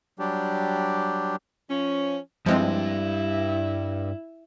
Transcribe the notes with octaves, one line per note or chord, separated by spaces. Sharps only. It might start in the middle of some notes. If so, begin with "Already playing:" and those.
F#3 G3 D4 G4
F3 C#4
G2 F3 G3 G#3 C4 E4